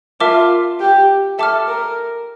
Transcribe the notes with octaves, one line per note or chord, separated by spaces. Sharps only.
F4 A#4 E5 A5 D6 F6
G4
A4 E5 A5 D6 F6
A#4